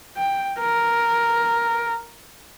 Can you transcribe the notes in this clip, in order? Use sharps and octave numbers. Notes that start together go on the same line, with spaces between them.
G5
A#4